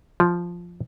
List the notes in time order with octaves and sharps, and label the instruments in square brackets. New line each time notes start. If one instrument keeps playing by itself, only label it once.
[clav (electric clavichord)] F3